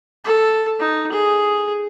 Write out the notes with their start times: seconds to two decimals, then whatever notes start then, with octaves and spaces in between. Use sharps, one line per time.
0.25 A4
0.79 D#4
1.12 G#4